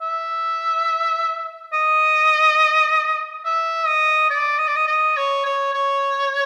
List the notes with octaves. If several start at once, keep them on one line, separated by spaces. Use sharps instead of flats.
E5
D#5
E5
D#5
D5
D#5
D5
D#5
D#5
C#5
C#5
C#5